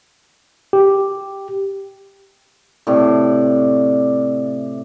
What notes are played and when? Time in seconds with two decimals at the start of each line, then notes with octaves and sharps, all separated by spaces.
0.73 G4
2.87 A2 C3 D5